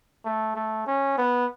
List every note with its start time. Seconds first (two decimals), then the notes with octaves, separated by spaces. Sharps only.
0.25 A3
0.56 A3
0.87 C#4
1.18 B3